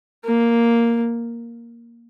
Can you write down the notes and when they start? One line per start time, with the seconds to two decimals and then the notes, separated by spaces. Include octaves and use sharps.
0.25 A#3